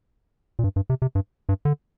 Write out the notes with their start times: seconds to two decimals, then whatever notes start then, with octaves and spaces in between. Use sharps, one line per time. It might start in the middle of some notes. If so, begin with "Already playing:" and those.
0.59 A#2
0.64 G2
0.76 G2
0.90 C3
1.02 C3
1.15 G2
1.49 G2
1.65 D3